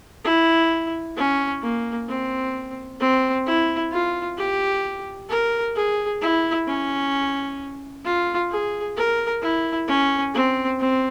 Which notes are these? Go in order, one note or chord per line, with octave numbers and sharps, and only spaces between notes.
E4
C#4
A#3
C4
C4
E4
F4
G4
A#4
G#4
E4
C#4
F4
G#4
A#4
E4
C#4
C4
C4